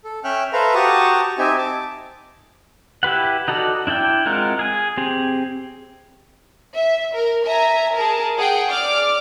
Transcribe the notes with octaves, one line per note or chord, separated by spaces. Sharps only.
A4
C#4 E5 G5 F6 F#6
A4 B4 C5 E5 F5 A#5
F#4 G4 A5 A#5 C#6 D#6
C4 D#4 G4 E5 G#5
A5 D6
E4 G4 B4 F#5
D#4 F#4 A4 D5
D4 E4 D5 G5
G#3 C4 F4 A#4 F#5
G#4 G#5
C4 G4 G#4
E5
A#4
E5 G#5 A#5
G#4 A#4 A5
G#4 F#5 G5
D5 D6 F6